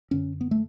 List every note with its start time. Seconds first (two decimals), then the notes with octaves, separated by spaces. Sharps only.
0.11 F#2 D3 C#4
0.41 B3
0.51 A3